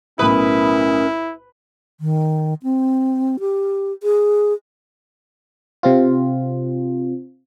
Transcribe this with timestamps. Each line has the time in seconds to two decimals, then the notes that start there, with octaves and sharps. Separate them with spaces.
0.19 B1 A2 C#4 E4 A#4 B4 D#6
2.00 D#3
2.63 C4
3.40 G4
4.03 G#4
5.83 C3 C4 F4